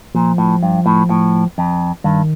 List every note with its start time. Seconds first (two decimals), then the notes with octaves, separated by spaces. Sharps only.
0.15 A#2 F3
0.38 A2
0.63 G2
0.86 A2
1.10 A2
1.58 F2
2.04 G2 D#3